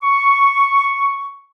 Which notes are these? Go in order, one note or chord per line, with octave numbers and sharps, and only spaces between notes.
C#6